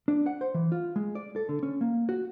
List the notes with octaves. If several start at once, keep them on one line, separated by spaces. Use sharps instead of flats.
D4
F#5
C5
E3
F4
G#3
D5
A4
D3
C#4
A#3
F#4